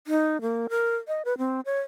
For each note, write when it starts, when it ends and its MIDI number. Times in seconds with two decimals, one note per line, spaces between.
0.07 0.41 63
0.42 0.67 58
0.70 0.96 70
1.08 1.22 75
1.25 1.37 71
1.38 1.61 60
1.66 1.80 73